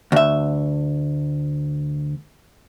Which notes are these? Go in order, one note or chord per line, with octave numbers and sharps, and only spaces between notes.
D2 E5